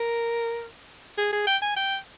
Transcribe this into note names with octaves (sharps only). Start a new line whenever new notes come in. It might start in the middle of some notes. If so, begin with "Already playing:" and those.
Already playing: A#4
G#4
G#4
G5
G#5
G5